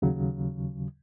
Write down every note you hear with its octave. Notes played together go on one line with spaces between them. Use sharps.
D#2 C#3 F#3